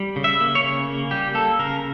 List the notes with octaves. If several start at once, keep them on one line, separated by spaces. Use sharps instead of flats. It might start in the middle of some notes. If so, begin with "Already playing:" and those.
Already playing: G3
C#3
E5
A#3
C#5
C#3
A#3
G3 G4
A#3 A4
C#3 A#4